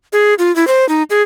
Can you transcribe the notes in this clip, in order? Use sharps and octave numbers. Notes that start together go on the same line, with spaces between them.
G#4
F4
E4
C5
D#4
G#4